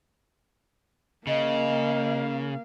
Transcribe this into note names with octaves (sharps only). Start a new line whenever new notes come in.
C#3 A#3 D#5 F5